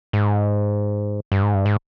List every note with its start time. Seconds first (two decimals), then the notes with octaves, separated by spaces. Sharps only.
0.13 G#2
1.32 G2
1.43 G#2
1.54 G2
1.66 G#2